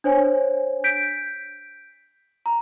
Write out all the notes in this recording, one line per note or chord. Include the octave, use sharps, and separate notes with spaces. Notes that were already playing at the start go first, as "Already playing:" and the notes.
D4 C5 C#5 G#5
G6 B6 D7
A#5